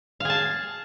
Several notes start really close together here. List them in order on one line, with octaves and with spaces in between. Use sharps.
F5 G#4 A5